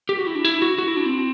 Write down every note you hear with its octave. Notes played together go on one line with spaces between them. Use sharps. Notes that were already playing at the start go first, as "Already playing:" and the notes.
G4
F#4
E4
D4
E4
F#4
F#4
E4
D4
C4